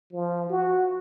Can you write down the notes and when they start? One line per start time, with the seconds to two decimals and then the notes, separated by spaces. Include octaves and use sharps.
0.13 F3
0.50 F#4